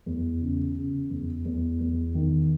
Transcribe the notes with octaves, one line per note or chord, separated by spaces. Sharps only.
E2
C#3
C#3
E2
E2
E2
D#3